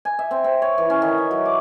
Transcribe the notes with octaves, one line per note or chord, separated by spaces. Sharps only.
G#5
E5
C4
C4
C#5
E3
C#4
D#3
E5
F#3
D6